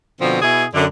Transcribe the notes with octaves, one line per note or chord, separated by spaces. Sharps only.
B2 D3 F3 C4
B2 E4 G#4
F#2 D3